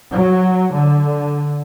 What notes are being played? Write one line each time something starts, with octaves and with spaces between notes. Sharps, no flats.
F#3
D3